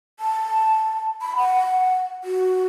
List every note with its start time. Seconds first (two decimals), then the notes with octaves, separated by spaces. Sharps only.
0.20 A5
1.22 B5
1.36 F#5
2.24 F#4